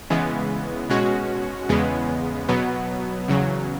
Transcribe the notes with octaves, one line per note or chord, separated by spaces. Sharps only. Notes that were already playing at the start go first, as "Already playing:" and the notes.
C#3 E3 G#3 B3
B2 G#3 C#4 F#4
E2 C#3 G#3 B3
B2 F#3 B3
E2 C#3 F#3